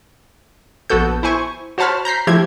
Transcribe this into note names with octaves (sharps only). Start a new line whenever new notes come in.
A#1 B3 F#4 A4 G6
E4 C5 G#5 C#6
F#4 C5 C#5 A5 B5 F6
A#5 G6 B6 C7
F3 A3 E4 G4 G#6